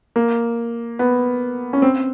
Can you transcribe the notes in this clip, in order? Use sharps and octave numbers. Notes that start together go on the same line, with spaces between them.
A#3
B3
C#4
C4